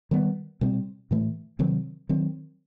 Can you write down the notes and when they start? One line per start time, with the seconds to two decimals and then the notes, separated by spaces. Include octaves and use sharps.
0.11 D#3 G3 B3
0.61 B2 G3 C4
1.11 A2 E3 A3
1.59 C3 D#3 F#3 C4
2.09 D#3 F#3 C4